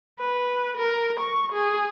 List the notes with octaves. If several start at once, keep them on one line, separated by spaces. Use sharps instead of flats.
B4
A#4
C#6
G#4